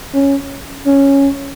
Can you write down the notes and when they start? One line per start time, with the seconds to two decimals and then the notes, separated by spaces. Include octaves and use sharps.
0.14 C#4
0.87 C#4